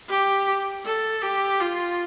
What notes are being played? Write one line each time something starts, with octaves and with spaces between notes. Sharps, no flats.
G4
A4
G4
F4